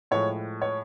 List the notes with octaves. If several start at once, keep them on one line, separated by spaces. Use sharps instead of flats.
A2 F3 G#3 C#5
C#5